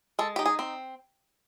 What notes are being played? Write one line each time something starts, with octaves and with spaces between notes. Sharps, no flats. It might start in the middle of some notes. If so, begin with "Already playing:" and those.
G#3 A4
D#4 G4
G#4
C4